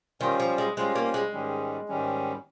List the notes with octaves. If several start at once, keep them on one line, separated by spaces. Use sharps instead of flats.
D#3 G3 C#4 F4 C5
F3
G#3
G3 G#3 C#4 F4 C5
A#3
G#3
G#2 D#3 G3 C#4
G#2 D#3 G3 C#4